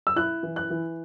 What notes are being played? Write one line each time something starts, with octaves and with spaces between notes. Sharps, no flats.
E6
E4 F#6
E3
F#6
E3